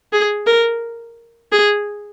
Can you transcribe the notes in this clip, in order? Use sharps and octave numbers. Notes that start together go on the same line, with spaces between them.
G#4
A#4
G#4